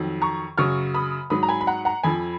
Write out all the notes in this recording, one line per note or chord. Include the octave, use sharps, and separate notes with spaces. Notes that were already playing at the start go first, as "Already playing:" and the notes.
Already playing: F2 D#3 F#3
A#5 C#6
F#2 C#3 F#3 C#6 F6
B5 D#6
G#2 F#3 B5 D#6
A#5
G#5 B5
B5
F#5 A#5
F#5 A#5
F2 F3 G#5 B5